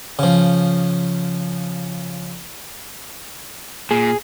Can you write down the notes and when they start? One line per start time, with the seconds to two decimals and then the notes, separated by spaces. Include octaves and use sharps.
0.19 C#3 F3
3.91 A#2 G#4